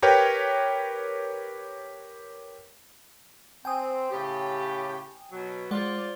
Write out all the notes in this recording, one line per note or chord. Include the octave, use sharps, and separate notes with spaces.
G4 A#4 B4 C#5 G5
C4 G5 G#5 D#6
A2 C#3 G4
B2 F#3
G#3 F4 C5 D5 F#5